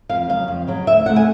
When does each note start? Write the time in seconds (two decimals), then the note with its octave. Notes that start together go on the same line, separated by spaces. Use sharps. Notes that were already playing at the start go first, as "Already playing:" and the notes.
0.09 F2 F5
0.29 C#3 F#3 F5
0.48 F2
0.67 C#3 F#3
0.87 D2 E5
1.06 C#3 F#3 A3 F#5
1.16 G#5